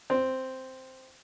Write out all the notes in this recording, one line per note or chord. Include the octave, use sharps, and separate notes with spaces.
C4